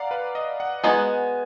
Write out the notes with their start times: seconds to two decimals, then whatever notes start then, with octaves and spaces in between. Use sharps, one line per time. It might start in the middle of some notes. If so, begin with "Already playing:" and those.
Already playing: D5 F5 F#5 A#5
0.11 B4
0.35 D#5
0.60 F#5
0.84 G#3 B3 D#4 F#4 G#5